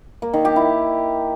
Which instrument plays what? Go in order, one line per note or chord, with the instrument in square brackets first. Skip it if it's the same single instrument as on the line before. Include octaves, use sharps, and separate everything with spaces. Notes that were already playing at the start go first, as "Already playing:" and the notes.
[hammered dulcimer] A#3
D#3
G4
E4